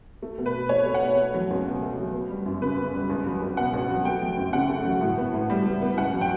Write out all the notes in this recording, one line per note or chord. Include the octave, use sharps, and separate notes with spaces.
A3
B2
B4
B2
A3 C#5
A3
F#5
B2
A3
F#3
C#2
B2
A3
F#3
B3
G3
F#2
C#3 B4
B3
G3
C#2
F#3
C#2
B2 F#5
C#2
F#3
A3 G5
F#3
F#2
C#3 F#5
A3
F#3
A2
B3
A2
G3
A2
B3
C#2 F#5
F#3
G5